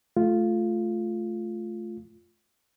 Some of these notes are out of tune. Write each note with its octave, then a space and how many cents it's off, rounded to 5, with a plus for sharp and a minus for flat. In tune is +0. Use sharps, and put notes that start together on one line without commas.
A3 -20 F4 -5